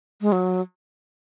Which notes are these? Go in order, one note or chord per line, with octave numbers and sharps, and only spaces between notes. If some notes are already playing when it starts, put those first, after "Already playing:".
G#3
F#3